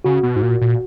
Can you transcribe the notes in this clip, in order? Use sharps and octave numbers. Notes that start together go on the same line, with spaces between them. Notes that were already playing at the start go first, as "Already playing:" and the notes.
C#3 F#4
B2
G#2
A#2
A#2